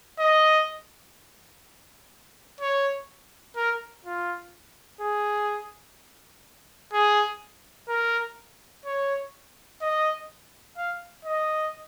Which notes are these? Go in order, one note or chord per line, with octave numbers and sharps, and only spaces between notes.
D#5
C#5
A#4
F4
G#4
G#4
A#4
C#5
D#5
F5
D#5